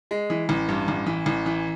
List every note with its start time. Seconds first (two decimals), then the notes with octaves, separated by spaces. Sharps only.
0.11 G#3
0.30 E3
0.49 A1
0.68 G2
0.88 A1
1.06 E3
1.26 A1
1.46 E3